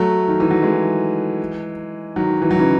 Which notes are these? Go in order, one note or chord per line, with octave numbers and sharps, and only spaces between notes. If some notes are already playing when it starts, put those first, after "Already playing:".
Already playing: F#3 A3
D#3
E3
F#3
E3 G#3
D#3 F#3
E3
F#3
C#3 E3